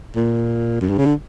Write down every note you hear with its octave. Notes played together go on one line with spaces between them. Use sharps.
A#2
F#2
G2
C#3
D3